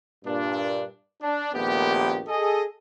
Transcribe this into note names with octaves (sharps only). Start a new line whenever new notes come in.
G2 A#2 D4
D4
A#1 D#2 A3 B3 G4
G#4 A4 D#5